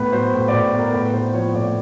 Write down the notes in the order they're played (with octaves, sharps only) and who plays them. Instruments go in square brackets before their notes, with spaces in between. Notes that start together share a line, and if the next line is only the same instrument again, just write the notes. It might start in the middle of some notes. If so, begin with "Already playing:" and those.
Already playing: [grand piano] A2 B3 B4
F#3 C5
A2
D5
A2
B3 A#4
A2 B4
A#3 C5
F3 C#5
A2 D5